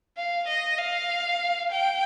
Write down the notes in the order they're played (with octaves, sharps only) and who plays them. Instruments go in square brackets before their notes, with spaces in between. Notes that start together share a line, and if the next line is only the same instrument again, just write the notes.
[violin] F5
D#5
F5
G5